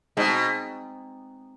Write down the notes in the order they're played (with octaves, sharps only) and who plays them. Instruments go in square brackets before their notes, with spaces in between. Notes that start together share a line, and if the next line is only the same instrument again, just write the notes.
[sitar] B2 [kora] G#3 C4 D#4